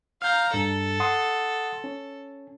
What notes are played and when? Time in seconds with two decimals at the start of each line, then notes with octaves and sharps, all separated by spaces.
0.22 F5 A#5 F6 G6
0.54 G2 A4
1.00 F#5 C6 D#6
1.84 C#4